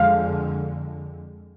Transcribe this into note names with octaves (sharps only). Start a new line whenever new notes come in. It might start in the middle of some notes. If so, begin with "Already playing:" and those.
Already playing: F2 D3 G#3 F5